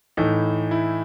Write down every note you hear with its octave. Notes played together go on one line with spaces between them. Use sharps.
A2 E3 D#4
E4